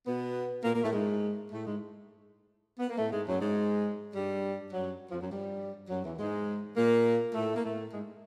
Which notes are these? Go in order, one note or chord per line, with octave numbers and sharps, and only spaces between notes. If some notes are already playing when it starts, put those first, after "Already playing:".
B2 B3
A#2 A#3
A#2 A#3
A2 A3
G#2 G#3
A2 A3
G#2 G#3
B3
A#3
A2 A3
G#2 G#3
F#2 F#3
G#2 G#3
G2 G3
F#2 F#3
F2 F3
F#2 F#3
G2 G3
F#2 F#3
E2 E3
G#2 G#3
A#2 A#3
A2 A3
A#3
A2 A3
G#2 G#3